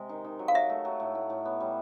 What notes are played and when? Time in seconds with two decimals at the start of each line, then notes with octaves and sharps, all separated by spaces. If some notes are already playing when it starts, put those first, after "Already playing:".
Already playing: C3 G#3
0.09 D#3
0.24 D#3
0.39 F#3
0.48 F5
0.55 F#3 E5
0.70 A3
0.85 F#3
1.00 A2
1.15 A2
1.30 A2
1.45 B3
1.60 G3